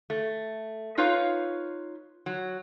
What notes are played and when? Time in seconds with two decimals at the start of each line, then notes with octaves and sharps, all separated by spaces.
0.10 A3
0.98 D#4 F4 B4 C#5 F5
2.26 F#3